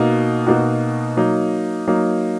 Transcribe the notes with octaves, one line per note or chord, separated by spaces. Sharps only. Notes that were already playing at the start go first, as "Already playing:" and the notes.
Already playing: B2 A#3 D#4 F#4
B2 A#3 D#4 F#4
F#3 A#3 D#4
F#3 A#3 D#4